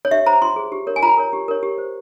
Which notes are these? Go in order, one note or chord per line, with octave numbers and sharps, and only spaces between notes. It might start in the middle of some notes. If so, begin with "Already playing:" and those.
C#5
G4 E5
C5 A#5
F4 C6
G#4 C5
G4
A#4 C#5
G#5
F4 A#5
A#4 C#5
G4
A#4 C#5
G4
C5